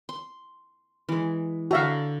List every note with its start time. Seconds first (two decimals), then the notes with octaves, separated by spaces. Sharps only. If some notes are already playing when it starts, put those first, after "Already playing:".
0.09 C6
1.09 E3 G#3
1.71 D3 F#4 E5 F5 A#5